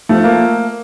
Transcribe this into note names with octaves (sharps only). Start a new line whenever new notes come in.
F3 A3
A#3